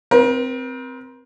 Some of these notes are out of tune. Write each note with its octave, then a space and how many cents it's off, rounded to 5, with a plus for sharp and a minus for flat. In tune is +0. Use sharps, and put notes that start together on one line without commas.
C4 -10 A#4 +40